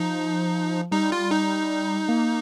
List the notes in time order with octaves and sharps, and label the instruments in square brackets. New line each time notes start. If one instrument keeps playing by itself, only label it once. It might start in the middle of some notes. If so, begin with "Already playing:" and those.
Already playing: [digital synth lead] F3 [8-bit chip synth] D#4
[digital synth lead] G3 [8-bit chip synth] D#4
[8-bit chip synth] F4
D#4
[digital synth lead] A#3